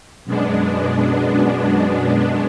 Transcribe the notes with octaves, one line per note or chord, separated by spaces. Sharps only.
F#2 B2 G#3 B3 D4